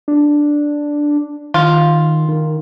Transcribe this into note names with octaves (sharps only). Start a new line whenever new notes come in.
D4
D#3 F4
D#3